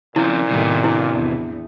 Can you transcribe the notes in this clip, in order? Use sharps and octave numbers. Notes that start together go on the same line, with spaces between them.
A#2 C#3 F3 C4 E4
A2 C3 D#3 G3 B3
D4 E4
E2